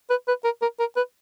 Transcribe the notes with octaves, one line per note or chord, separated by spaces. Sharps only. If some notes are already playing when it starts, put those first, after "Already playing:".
B4
B4
A#4
A#4
A#4
B4